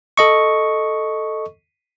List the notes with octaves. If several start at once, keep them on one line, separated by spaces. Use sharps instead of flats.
A4 D#5 C#6